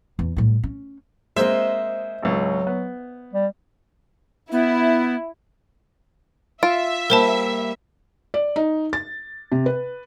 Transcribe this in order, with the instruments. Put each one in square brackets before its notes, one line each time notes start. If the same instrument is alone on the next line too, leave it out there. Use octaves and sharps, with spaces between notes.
[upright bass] E2
A2 G3
C#4
[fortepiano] G#3 A#3 C4 [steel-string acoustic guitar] C5 D#5 [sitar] E5
[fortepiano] G#1 C#2 [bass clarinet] F#3
[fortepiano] B3
[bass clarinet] G3
[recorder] B3 [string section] E4
[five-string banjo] F4 [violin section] E5 [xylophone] D7
[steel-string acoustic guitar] G3 A#3 [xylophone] A#4 C5 A5
[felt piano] D5
D#4
A6
C3
B4